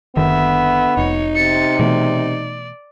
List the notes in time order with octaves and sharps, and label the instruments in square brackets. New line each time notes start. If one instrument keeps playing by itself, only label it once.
[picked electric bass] F#1 D#3 [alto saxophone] D3 [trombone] B3 [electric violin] E5
[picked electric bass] F1 [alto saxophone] D#4 [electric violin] C#5
[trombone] C3 [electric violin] A6 C#7
[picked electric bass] B2 E3 A3 [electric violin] D5